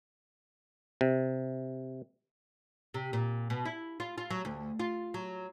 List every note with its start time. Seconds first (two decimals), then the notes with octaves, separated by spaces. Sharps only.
1.01 C3
2.94 C3
3.13 A#2
3.50 B2
3.65 E4
4.00 F4
4.18 F4
4.30 F#3
4.45 D2
4.80 F4
5.14 F#3